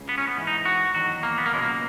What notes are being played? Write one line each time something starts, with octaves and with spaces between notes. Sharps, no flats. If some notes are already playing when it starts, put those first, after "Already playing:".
Already playing: C#2 C#3
B3
C#4
B3
G#2 E3
D#4
F#4
E2 D#3 F#3 F#4
A#3
B3
A#3
C#2 B2 F#3 G#3
A#3